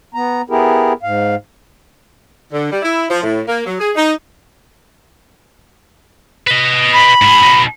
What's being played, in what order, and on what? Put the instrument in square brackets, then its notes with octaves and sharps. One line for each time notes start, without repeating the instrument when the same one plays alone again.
[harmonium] B3 A#5
B3 E4 G4 G#4 A#4
G#2 F5
[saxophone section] D3
G3
E4
F3
A2
A#3
F#3
G#4
D#4
[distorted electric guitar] B4 D#5
[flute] B5
[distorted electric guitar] G#2 G#4
B2 D#4